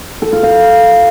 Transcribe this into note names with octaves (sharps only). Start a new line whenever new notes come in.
A4
F4
F5